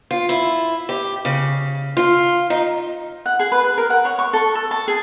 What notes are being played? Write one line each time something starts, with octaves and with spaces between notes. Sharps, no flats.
F4
E4
G4
C#3
F4
D#4
F#5
G#4
B4
B4
A#4
F#5
C#5
C#6
A4
A4
A5
G#4